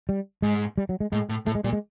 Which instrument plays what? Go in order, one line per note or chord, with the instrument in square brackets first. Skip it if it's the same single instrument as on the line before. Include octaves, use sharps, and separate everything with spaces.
[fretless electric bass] G3
[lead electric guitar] G#2 [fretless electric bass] G#3
[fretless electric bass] G3
F#3
G#3
[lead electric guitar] A2 [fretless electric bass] G#3
[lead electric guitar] A2
[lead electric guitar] A2 [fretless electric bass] A3
[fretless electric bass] G#3
[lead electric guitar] A#2 [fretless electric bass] G3
[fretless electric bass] G#3